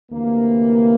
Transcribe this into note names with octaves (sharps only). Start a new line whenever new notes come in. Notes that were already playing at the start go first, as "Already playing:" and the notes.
D2 C3 E3 A#3